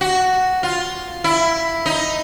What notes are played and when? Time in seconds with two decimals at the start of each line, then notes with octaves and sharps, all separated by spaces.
0.01 F#4
0.63 F4
1.24 E4
1.86 D#4